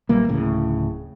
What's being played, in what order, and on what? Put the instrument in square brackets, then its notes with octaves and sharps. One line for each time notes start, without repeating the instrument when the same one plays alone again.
[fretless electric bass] A#1 E3 G3 A#3
D1 A2 C#3